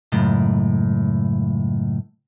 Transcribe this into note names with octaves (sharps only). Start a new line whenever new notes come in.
C#2 F#2 A2